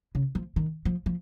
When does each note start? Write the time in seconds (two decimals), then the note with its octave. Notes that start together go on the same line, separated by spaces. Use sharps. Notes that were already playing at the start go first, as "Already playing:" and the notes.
0.15 C#3
0.35 F3
0.56 D#3
0.85 F3
1.06 F3